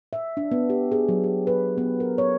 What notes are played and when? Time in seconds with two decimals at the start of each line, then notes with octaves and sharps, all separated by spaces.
0.13 E5
0.37 D4
0.51 B3
0.70 G4
0.92 G#4
1.09 F#3
1.24 G4
1.47 B4
1.78 B3
2.00 A#4
2.18 C#5